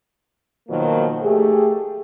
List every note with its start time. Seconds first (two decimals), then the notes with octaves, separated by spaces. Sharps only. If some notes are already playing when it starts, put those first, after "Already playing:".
0.68 B2 D#3 F3 F#3 A#3
1.22 A3 G4 G#4